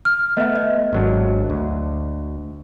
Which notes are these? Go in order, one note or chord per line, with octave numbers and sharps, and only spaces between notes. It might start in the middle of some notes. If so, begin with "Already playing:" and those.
F6
A3 B3 D#5 E5
D#5
G#1 F#3 D4
D2